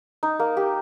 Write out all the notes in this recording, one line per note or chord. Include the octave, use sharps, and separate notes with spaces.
D#4
A#3
G4